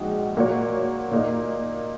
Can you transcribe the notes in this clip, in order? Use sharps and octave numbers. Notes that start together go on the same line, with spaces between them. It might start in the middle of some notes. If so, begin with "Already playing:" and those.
Already playing: A#1 G#2 G#3 D#4 F#4
A#2 A#3 F#4 C#5
A#2 A#3 D#4